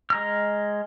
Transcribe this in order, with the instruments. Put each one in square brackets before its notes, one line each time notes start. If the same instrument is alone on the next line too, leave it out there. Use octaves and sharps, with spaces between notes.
[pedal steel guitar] G#3 A#5 F6